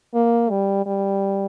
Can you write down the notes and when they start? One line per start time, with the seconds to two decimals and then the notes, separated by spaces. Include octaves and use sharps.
0.14 A#3
0.50 G3
0.86 G3